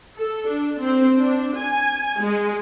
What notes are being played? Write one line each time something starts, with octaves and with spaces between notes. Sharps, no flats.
A4
D4
C4
D4
G#5
G#3